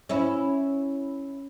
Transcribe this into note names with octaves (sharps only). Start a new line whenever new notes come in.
C#4 E4